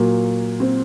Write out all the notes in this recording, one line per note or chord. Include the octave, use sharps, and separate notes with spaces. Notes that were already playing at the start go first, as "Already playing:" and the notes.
Already playing: A#2 F#3 A#3
C4